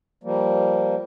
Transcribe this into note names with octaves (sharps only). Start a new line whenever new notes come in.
F3 G3 A#3